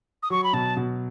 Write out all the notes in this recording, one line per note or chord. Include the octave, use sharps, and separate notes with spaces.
D#6
F#3 C#6
B5
B2 A5
B2